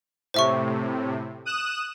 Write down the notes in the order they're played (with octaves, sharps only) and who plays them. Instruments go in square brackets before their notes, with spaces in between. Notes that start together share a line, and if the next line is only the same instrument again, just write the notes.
[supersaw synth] A2 C3 [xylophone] C5 E5 C#6
[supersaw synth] D#6 F#6 E7